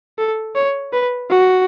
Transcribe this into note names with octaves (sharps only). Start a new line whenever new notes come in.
A4
C#5
B4
F#4